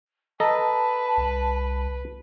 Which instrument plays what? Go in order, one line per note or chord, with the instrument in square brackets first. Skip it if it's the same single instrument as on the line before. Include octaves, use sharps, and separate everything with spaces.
[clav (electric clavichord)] A4 D#5 A#5 [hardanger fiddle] B4 [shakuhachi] A5
[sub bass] C2